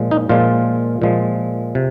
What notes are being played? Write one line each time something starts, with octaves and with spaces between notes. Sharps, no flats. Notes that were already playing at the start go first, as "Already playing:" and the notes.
Already playing: A#2 F3 G#3
D#4
A#2 F3 G#3 F4
A#2 F3 G#3
C3